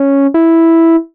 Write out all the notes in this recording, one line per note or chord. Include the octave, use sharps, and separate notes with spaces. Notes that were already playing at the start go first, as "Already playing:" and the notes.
Already playing: C#4
E4